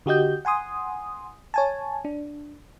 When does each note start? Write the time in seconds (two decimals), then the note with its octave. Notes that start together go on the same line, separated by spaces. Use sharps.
0.06 D3 F#4 G4 D#5 G6
0.45 F#5 G#5 C6 D#6
1.54 C#5 G#5 A5
2.05 D4